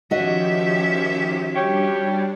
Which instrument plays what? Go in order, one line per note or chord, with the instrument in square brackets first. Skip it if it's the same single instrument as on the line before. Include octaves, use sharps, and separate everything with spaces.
[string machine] D#3 F3 G4 [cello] C#4 E5 [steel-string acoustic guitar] F#4 D#5
[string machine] G3 D4 [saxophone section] G4 C#5